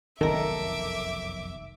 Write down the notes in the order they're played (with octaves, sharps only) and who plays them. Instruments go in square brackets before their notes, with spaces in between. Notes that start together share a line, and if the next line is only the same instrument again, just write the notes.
[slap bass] F1 B1 F#2 [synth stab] D#3 [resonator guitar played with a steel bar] A4 A#4 [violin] E5 D6